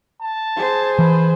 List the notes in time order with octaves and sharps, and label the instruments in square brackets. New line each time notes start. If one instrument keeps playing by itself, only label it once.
[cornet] A5
[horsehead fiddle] G#4 C5
[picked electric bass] E3 [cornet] B4